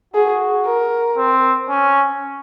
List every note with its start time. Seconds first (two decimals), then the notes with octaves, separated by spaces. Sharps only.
0.14 F#4 G#4
0.66 A#4
1.18 C4
1.69 C#4